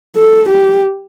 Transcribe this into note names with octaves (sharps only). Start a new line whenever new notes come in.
A4
G4